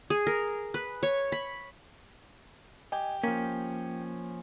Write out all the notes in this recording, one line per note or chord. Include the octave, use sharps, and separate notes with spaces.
G#4
A#4
B4
C#5
B5
G4 D#5 G#5
F3 A#3 C#4